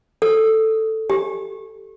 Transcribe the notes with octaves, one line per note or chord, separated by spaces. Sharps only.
A4
G4